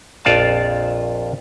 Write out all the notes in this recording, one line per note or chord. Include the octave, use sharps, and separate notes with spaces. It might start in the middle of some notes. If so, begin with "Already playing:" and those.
A#1 F2 F4 D5 F5 A5